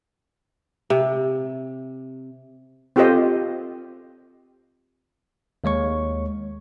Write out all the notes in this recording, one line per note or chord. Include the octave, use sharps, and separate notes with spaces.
C3
C4 F4 G4 A4 C5 D#5
D#2 G#3 C#5 C#6